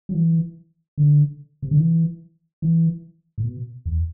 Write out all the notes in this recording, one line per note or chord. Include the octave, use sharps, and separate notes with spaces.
F#3
E3
D3
C3
D3
E3
E3
A2
B2
E2